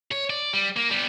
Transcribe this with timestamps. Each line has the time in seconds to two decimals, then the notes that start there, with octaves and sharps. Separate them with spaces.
0.11 C#5
0.30 D5
0.54 G3
0.77 A#3
0.91 G3 B3